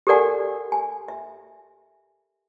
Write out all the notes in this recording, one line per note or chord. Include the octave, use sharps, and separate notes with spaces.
G4 A4 A#4 D5 F#5 G#5
G#5
E5